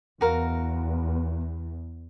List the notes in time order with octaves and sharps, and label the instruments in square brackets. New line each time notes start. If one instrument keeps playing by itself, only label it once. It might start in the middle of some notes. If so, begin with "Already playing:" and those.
[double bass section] E2 [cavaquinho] F#4 A#4 F5